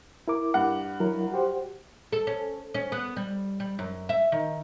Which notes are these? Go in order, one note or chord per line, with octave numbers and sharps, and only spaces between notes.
E4 A#4 D6
G2 F#5
F#3 E4 A#4
F#4 G4 C5
A4
C#4
C#4
B3
G3
G3
F#2
E5
D#3